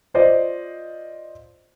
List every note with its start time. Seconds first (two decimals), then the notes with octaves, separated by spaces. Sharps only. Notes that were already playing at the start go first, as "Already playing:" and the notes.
0.14 F4 C5 D5 D#5